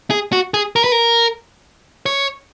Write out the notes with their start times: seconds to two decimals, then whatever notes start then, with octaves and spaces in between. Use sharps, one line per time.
0.10 G#4
0.33 F#4
0.54 G#4
0.76 A#4
0.84 B4
0.92 A#4
2.06 C#5